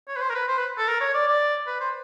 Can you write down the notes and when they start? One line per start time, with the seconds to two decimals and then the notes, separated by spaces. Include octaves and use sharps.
0.08 C#5
0.16 B4
0.21 C5
0.30 A#4
0.35 B4
0.48 C5
0.58 B4
0.78 A4
0.88 A#4
1.01 C#5
1.14 D5
1.28 D5
1.67 B4
1.80 C5